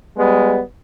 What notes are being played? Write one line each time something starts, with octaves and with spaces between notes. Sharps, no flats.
G3 G#3 B3